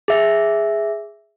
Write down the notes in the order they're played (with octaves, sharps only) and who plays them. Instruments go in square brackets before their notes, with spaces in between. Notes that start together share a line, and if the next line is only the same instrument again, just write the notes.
[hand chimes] G#4 E5